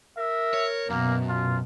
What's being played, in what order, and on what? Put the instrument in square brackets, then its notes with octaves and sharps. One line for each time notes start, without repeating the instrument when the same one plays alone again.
[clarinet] A#4 [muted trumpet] E5
[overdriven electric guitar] C#5
[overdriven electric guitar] F#2 [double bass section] B2 [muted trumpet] A#3
[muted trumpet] F4